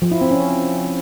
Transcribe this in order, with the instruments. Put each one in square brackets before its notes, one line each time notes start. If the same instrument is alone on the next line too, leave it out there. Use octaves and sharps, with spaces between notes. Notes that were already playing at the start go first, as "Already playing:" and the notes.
[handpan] F3
E4
C4
C#4